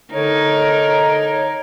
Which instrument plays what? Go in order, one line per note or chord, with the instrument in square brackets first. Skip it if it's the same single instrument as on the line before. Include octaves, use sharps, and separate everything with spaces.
[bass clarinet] D3 [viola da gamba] D#4 A#4 [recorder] C#5